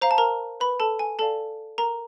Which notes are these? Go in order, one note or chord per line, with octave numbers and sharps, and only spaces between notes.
C5 F5 A#5
A5
A#4 A#5
B4 B5
A4 A5
G#5
A4 D5 F5 A5
A#4 A#5